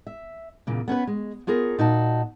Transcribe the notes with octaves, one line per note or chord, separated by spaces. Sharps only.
E5
E2 A#2 C#3
B3 C#4 A#4 B4
G#3
B3 F4 G#4 A#4 C#5
A#2 D#4 F#4 A5